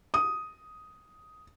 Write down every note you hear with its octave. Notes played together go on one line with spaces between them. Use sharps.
D#6